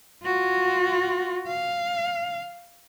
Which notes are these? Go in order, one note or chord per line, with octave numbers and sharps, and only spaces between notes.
F4 F#4
F5